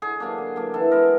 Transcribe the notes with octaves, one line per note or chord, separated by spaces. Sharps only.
D3 G#4
F#3 A#3 D4
D3
F#3 A#3 D4
E3 A4
G#3 B3 D4 A#4